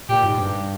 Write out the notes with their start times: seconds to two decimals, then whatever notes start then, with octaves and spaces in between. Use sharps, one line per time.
0.09 A#2 G4
0.24 G#2
0.38 G2